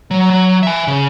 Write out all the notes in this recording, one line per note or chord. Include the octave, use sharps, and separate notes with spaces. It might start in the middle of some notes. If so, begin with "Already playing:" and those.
F#3
F#3
E5 G#5
C#3